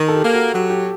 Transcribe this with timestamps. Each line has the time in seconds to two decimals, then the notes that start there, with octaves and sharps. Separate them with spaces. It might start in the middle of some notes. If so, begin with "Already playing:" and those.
Already playing: D#3
0.08 A4
0.14 G4
0.23 A#3
0.34 F#4
0.54 F#3 G4
0.70 G4